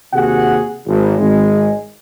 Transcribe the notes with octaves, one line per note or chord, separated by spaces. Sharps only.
D#2 C3 F#4 G#4 F#5
G#1
G#1 G#3